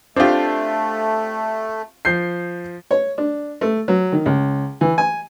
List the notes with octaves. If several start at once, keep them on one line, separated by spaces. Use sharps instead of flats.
A3 C4 D4 F4 G4
F3 G6 C7
C#5
D4
A3
F#3
D#3
C#2
E3
G#5